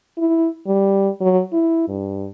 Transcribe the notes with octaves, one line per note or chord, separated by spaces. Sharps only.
E4
G3
F#3
E4
G2